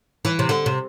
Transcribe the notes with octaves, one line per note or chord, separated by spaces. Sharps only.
E3
C3
D3
C3